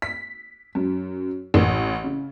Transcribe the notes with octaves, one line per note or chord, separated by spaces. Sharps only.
B6
F#2
A1
C#3